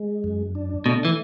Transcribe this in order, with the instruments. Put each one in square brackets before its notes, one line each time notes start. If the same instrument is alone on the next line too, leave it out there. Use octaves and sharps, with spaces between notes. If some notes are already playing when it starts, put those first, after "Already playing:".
Already playing: [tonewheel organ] G#3
F#2
D4
[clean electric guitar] B2 [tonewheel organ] A3
[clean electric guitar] E3